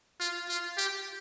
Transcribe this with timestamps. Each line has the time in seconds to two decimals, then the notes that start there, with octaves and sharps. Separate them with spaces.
0.20 F4
0.48 F4
0.77 G4